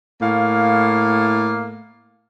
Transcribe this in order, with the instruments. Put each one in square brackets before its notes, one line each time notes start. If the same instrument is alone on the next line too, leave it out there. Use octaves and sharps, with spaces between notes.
[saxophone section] A2 A#3 F5